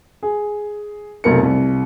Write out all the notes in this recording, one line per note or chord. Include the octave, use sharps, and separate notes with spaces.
G#4
F1 B1 A#4 C#7
C2